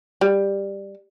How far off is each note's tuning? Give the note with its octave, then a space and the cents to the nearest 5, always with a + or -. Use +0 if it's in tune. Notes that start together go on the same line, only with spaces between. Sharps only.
G3 +10